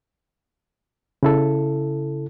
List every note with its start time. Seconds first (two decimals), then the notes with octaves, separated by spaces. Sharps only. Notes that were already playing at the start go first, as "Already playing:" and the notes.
1.23 C#3 E4 A4